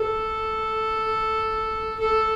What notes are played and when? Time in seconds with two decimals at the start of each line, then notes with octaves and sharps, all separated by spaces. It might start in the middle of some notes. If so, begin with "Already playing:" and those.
Already playing: A4
1.99 A4